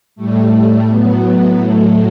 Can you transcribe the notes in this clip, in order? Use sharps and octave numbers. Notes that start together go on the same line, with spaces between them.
A2 G3 A3
A2 F#3 B3
A2 F#3 A3